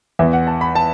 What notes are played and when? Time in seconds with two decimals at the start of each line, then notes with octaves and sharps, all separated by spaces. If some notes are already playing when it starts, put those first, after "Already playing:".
0.19 E2 E3 B3 E5
0.33 F#5
0.47 A5
0.61 B5
0.75 A5